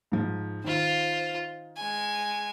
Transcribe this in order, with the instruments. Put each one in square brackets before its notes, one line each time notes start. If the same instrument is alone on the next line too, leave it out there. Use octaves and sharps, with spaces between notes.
[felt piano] G#2 F3
[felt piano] D#3 [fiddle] F4 C5
[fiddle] G#3 G#5